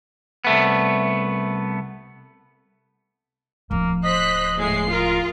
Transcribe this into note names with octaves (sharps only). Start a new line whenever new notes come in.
C2 A3 B3
D1 F3 A#3
C5 D#5 F#6 B6
A2 G#3 C7
F4 A#4